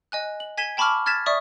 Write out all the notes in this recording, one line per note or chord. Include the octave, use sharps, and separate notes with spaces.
D#5 G#5 F#6
F#7
G#5 G#6 B6 D#7 E7 G7
G5 A5 B5 C#6 D6 F6
F6 G#6 A6 B6 E7
D5 E5 C#6 D#6